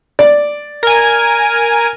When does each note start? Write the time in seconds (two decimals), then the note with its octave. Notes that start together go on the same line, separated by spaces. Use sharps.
0.19 D5
0.83 A#4 G#5